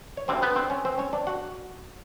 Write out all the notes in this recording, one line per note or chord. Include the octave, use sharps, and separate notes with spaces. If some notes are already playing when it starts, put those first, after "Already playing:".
C#5
D2 D3 G3 C4 C5
B3 B4
C4 C5
C#4 C#5
C4 C5
C#4 C#5
D4 D5
F#4 F#5